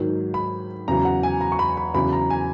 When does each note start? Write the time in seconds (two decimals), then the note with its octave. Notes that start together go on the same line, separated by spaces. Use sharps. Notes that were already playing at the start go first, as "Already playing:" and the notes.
Already playing: G#2 D#3 F#3
0.34 B5
0.88 E2 C#3 F#3 A#5
1.05 F#5
1.23 G#5
1.41 A#5
1.52 C#6
1.59 B5
1.77 B5
1.94 E2 C#3 F#3 B5
2.13 A#5
2.30 G#5